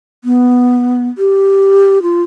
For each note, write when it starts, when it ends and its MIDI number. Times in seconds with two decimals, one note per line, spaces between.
0.24 1.08 59
1.18 2.02 67
2.02 2.23 65